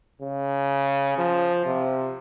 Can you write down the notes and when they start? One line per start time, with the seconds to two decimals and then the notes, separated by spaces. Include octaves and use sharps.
0.22 C#3
1.18 F3
1.66 C3